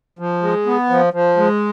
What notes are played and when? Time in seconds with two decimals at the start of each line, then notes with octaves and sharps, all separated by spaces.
0.19 F3
0.42 G#3
0.66 B3
0.90 F3
1.13 F3
1.37 G#3